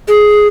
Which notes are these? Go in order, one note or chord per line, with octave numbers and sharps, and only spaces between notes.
G#4